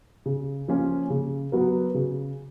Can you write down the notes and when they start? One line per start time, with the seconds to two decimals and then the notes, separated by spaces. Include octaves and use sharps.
0.26 C#3
0.68 F3 A#3 C#4 F4
1.10 C#3
1.52 F#3 B3 F#4 A#4
1.95 C#3